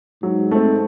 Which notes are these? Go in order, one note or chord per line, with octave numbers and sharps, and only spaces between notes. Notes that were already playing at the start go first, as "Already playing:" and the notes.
G#2 F#3
A3 C4